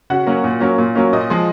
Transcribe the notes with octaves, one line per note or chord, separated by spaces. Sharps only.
C#3 F#4 F#5
F#3 A#3 C#4
A#2
F#3 A#3 C#4
A#2
F#3 A#3 C#4
A#2 D#5
F3 G#3